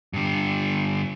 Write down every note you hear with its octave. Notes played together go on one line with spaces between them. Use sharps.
G2 D3